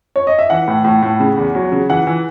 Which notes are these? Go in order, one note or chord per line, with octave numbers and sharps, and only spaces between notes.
C#5
D#5
E5
E3 F#5
A2
A2
A2
C#3
E2
F#3
C#3
E3 F#5
E3